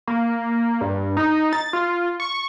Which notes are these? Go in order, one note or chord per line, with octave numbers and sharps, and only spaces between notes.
A#3
G2
D#4
A6
F4
C#6